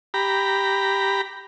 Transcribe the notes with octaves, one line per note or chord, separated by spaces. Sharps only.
G4 A#5 B5